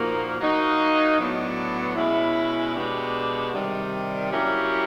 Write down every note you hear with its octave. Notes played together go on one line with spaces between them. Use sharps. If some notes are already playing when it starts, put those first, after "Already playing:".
Already playing: A#2 F3 A#3 D#4 F#4
F#3 A#3 D#4 F#4
A2 F#3 B3 D4
B2 G#3 C#4 E4
B2 G#3 B3 D4 G4
C3 D#3 G3
F#3 A#3 C#4 E4 G4